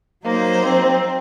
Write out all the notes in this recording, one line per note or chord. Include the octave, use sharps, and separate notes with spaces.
F#3 A#3 D#4 C5
C4